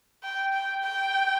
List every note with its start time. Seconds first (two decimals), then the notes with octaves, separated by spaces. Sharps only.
0.24 G5
0.53 G5
0.83 G5